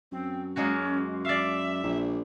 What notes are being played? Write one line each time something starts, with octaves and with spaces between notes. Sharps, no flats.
F#2 C4
G#3 A#3 C#4 F#4
D5 E5 F5
A#1